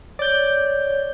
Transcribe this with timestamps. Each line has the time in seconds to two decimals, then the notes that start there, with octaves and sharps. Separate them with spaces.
0.19 C#5 D5 G6